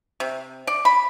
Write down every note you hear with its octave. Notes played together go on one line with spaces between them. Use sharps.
C3
D5
B5